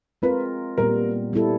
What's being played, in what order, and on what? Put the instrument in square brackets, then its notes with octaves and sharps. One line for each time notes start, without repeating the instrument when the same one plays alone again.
[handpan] G#3 C4 F4 A#4 [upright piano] B4
[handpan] A#2 G3 B3 [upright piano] A#4
[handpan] G3 B3 E4 A4